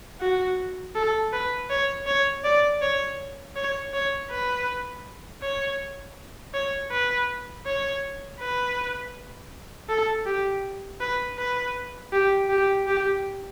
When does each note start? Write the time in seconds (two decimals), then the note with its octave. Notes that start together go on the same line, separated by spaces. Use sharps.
0.21 F#4
0.95 A4
1.33 B4
1.70 C#5
2.07 C#5
2.44 D5
2.82 C#5
3.56 C#5
3.93 C#5
4.30 B4
5.42 C#5
6.54 C#5
6.91 B4
7.66 C#5
8.40 B4
9.89 A4
10.26 G4
11.01 B4
11.38 B4
12.13 G4
12.50 G4
12.87 G4